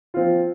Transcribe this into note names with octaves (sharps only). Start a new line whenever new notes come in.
F3 C4 F4